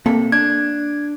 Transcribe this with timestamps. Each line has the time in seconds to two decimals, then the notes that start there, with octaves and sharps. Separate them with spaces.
0.06 C3 A#3 A4
0.32 D4 G#6